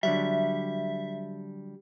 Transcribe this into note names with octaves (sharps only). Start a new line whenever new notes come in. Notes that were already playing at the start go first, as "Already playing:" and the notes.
D3 F#3 G3 E5